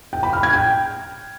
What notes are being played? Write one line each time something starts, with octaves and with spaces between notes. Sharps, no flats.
G5
B5
F6
G#6
G5